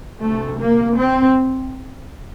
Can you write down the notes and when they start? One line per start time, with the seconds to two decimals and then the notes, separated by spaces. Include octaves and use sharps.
0.20 D2 C3 A3
0.60 A#3
0.99 C4